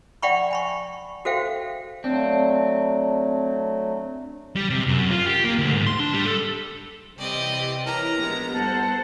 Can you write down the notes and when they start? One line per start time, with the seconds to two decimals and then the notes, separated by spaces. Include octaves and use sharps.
0.22 D5 E5 F#5 G5 B5 C#6
0.51 G#5 B5 C#6
1.25 F#4 A4 C5 E5 F5 G5
2.04 F#3 A3 C4 D4 F4
4.56 G3
4.70 C3
4.87 F#2
5.10 F4
5.26 G4
5.44 A#3
5.58 D2
5.74 G#2
5.87 C6
6.00 D4
6.14 G3
6.26 A4
7.18 C3 E3 G3 C4 D5 D#5 G5
7.86 E3 E4 A#4 C#5 A#5
8.16 A#1 G3 G#3 B3
8.54 G2 G3 B3 A4 C5 F#5 A5